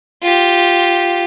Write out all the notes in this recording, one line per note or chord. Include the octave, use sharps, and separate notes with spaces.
F4 G4